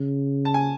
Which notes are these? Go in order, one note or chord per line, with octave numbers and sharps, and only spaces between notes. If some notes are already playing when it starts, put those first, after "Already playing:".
Already playing: C#3
A5
G#5